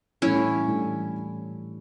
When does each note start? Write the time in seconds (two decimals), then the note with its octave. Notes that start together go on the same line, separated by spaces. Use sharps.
0.22 A2 E3 G3 C#4 D4 E4 A4
0.67 A2 E3 G3 D4 A4